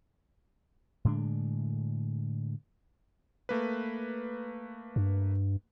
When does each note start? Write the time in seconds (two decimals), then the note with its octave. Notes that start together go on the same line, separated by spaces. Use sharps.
1.05 A2 D3 G#3 D4
3.49 A3 A#3 B4
4.96 G2